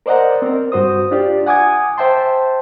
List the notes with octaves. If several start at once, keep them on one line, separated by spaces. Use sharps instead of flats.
A#4 C5 D5 D#5 F#5 A#5
C4 A#4
G2 F#4 C5 D#6
D4 F4 G4 D5
F#5 G#5 D6 D#6 G#6
C5 E5 G5 A5 C6